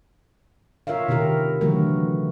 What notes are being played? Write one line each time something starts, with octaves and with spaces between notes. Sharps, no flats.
F4 A#4 C#5 E5 F5
C3 D#3 E4 G4 A#4
D3 E3 F#3 A3 F#4 A#4